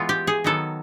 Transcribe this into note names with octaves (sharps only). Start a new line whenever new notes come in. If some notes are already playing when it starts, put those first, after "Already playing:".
Already playing: E3 G#3 B3 F4
G4
G#4
D#3 F#3 B3 A4